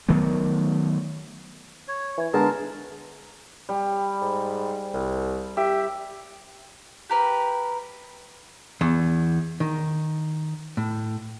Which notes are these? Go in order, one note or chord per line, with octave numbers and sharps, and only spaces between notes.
D#3 F#3 A3 B3
C#5
E3
D3 G#3 B3 G#4 A#4 A5
G3
G#2
C2
G4 E5
G4 A#4 B4
E2
D#3
A2